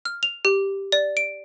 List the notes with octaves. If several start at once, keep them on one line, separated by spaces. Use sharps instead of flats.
F6
F7
G4
D5
D7